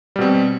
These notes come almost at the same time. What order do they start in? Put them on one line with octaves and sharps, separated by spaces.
G3 B2 C4